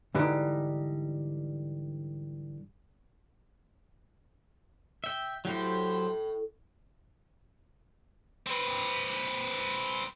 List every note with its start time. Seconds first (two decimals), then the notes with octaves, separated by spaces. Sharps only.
0.15 G#2 D3 E3 G3 D#4
5.04 E5 G5
5.45 A2 F#3 G4 C5
8.46 C4 B4